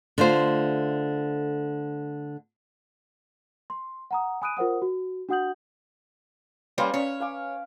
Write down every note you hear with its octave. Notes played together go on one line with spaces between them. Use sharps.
D3 A3 F4 C5
C6
F#5 A#5 D#6
G#5 B5 D#6 F#6 D7 D#7
F4 A#4 C5 F#5 D#6
F#4
D4 F#4 F#5 D#6 G6 F#7
G3 A#3 C#4 B4 D5 F5 G#5 C6
C#4 C#5 D5
F5 G#5 D6